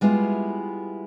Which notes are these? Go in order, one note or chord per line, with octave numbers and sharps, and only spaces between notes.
G3 G#3 B3 E4 F4